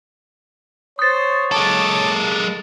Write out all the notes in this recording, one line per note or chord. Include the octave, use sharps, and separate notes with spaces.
C5 C#5 D#6 A6
G#3 A4 A5 D6